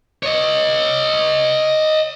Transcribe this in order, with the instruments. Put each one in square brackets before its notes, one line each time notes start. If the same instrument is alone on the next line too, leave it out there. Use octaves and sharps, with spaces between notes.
[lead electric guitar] C#5 D#5